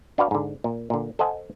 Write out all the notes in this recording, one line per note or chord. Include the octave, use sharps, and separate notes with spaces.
D4 F#4 B4 D5 F5
G#2 D3
A#2
A#2 D3
A4 C5 D#5 F#5 G#5